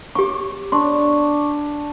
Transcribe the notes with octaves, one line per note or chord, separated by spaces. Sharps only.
G4 C#6 D6
D4 C6 C#6